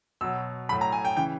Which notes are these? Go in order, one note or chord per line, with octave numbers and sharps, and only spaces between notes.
B2 F#3 E6
A2 F#3 B5
A#5
G#5
G5
C#3 E3 G5